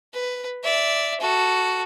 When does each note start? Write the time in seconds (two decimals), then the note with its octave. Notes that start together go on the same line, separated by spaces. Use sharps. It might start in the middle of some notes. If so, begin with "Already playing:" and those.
0.13 B4
0.63 D5 E5
1.20 F#4 A4